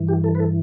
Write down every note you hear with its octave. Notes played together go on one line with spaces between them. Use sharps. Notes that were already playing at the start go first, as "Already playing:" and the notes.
Already playing: G2 E3
G4
A4
B4
A4